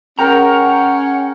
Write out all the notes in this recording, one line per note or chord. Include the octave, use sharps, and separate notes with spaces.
G#3 C#4 A#4 F#5 G5 A#5